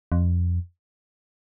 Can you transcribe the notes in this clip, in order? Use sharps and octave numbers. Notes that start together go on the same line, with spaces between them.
F2